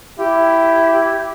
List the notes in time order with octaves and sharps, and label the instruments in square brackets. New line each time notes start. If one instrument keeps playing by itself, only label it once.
[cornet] E4 [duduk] G4